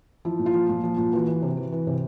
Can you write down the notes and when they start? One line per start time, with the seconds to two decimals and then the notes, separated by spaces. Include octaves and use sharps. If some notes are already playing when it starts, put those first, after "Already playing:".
0.25 F3 E4
0.39 A#2
0.46 F4
0.54 F3
0.69 A#2
0.84 F3
0.97 A#2
1.13 E3 F#4
1.27 E3
1.42 C3
1.57 E3
1.72 E3
1.87 C3